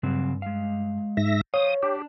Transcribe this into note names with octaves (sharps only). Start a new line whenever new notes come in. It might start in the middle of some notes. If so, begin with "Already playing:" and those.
G2 C#3 F#3 C4
G#3 F5
G#2 E5 A#6
C5 C#5 F5 D#6
D4 G4